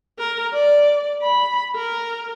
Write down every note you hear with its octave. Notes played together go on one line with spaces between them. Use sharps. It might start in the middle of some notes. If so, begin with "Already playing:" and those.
A#4
D5
B5
A#4